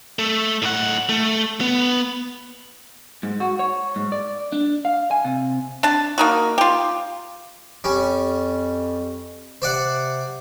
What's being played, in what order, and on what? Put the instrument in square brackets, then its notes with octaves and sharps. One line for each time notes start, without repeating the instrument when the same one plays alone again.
[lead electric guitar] A3
A2 F#5
A3
B3
[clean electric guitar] G#2
F#4
C#5
G#2
D5
D4
F5
G#5
C3
[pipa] D4 A5
A#3 D#4 F#4
F4 G4
[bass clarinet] F2 [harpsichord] G3 C#4
[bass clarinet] C3 [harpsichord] C5 D5 F#5